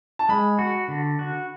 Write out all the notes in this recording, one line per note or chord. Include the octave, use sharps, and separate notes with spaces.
A5
G#3 B5
F#4
D3
F#4